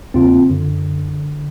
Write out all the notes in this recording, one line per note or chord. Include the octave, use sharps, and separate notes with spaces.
E2 C#3 A#3 C4 F4
F#2 D3